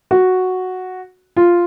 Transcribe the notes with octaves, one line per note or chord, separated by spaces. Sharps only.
F#4
F4